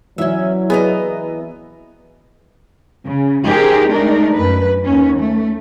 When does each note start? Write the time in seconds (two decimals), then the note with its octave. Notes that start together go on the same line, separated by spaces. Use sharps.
0.18 E3 F#3 C#4 E4 E5
0.70 B3 G#4 B4 D#5 A#5
3.05 C#3
3.45 D#4 G4 G#4 A#4 C5
3.91 G#3 A3 D4 D#4 A#4
4.34 F#2 B4
4.84 D#2 C#4
5.18 A3